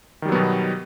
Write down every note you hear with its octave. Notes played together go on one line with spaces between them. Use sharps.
B2 D#3 F#3 G3 B3